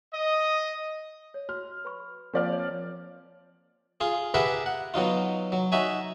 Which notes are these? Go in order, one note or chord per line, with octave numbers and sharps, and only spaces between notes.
D#5
C#5
F#4 F6
B4 B5 C#6
F3 A#3 C4 D5 F6
C#5 D#5
F4 G#4
G4 G#4 A#4 B4 E5 F#5
F#5
B2 F#3 D#4 F4
F#3
D#4 F#4 E5 G#5